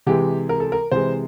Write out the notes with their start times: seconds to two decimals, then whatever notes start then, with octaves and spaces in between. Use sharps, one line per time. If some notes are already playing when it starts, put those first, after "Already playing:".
0.06 C3 E3 G#3 G4
0.49 A#4
0.60 A4
0.72 A#4
0.92 C3 E3 G#3 C5